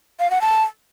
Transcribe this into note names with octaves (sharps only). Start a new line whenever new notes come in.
F5
F#5
A5